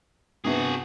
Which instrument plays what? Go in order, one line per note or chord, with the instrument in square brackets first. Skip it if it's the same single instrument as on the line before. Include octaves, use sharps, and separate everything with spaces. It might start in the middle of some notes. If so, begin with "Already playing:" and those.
[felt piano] G2 C3 B3 [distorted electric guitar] F#4 G#4